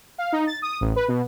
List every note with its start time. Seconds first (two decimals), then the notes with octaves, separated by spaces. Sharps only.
0.18 F5
0.32 D#4
0.47 A6
0.62 D#6
0.81 A1
0.96 B4
1.08 B2